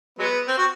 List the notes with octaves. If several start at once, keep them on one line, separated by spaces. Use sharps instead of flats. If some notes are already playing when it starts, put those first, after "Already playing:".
F#3 G#3 B3
C4
F#4